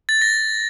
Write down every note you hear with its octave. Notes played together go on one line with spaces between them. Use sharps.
A6
A#6